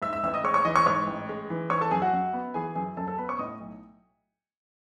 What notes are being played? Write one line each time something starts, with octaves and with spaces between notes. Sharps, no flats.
G#2 E5 E6
E5 E6
A1 E5 E6
D#5 D#6
G#3 C#5 C#6
C#5 C#6
E3 D#5 D#6
C#5 C#6
G#2 C#5 C#6
A1
G#3
E3
E3 C#5 C#6
A4 A5
F#2 G#4 G#5
F#4 F#5
F#2
B3
E3 G#4 G#5
F#2 G#4 G#5
F#2 A4 A5
A4 A5
B3 B4 B5
C#5 C#6
A2 D#5 D#6
B1